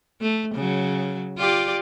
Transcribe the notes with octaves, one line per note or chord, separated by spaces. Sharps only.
A3
C#3 F#3
F4 G4 D5